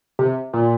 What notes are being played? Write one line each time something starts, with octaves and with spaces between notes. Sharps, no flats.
C3
A#2